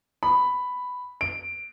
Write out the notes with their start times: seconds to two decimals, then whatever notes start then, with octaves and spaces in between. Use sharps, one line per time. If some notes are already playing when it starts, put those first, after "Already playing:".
0.23 B5
1.21 D7